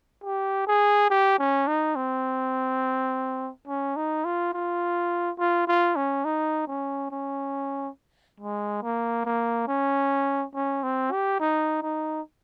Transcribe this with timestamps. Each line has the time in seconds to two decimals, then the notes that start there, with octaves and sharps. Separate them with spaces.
0.24 G4
0.67 G#4
1.10 G4
1.38 C#4
1.67 D#4
1.96 C4
3.67 C#4
3.96 D#4
4.25 F4
4.53 F4
5.39 F4
5.67 F4
5.96 C#4
6.25 D#4
6.67 C#4
7.11 C#4
8.40 G#3
8.83 A#3
9.25 A#3
9.68 C#4
10.54 C#4
10.83 C4
11.12 G4
11.40 D#4
11.82 D#4